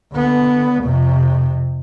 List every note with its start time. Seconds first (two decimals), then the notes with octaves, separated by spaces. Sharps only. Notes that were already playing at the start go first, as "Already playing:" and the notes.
0.13 D3 B3
0.84 F2 C3